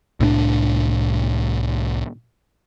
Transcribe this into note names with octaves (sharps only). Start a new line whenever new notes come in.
C2 A2 C4 D4